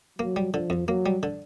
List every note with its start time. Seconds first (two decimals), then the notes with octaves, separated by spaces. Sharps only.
0.19 F#3 A#3
0.36 G3
0.53 D3 F3
0.70 F2
0.88 F#3 A#3
1.06 G3
1.23 D3